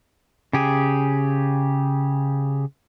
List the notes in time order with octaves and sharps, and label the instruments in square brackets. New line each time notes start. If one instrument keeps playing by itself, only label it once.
[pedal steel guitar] C#3 G4 G#4